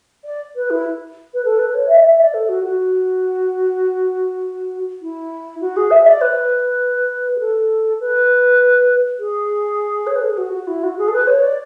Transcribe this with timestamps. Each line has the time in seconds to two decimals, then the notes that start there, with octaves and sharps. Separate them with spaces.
0.24 D5
0.55 B4
0.70 E4
1.33 B4
1.44 A4
1.58 B4
1.74 C#5
1.88 E5
1.96 D5
2.03 E5
2.19 D5
2.33 A4
2.48 F#4
2.63 F#4
5.01 E4
5.60 F#4
5.76 G#4
5.90 E5
6.05 D5
6.21 B4
7.35 G#4
7.39 A4
8.00 B4
9.19 G#4
10.06 C#5
10.15 B4
10.21 A4
10.29 G#4
10.37 F#4
10.52 F#4
10.67 E4
10.83 F#4
10.98 G#4
11.07 A4
11.12 B4
11.27 C#5
11.42 D5